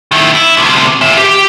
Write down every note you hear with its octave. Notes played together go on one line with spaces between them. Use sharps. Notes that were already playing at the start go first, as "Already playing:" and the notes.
D#3 E4
E4
D2 C3
A#2 E5
G4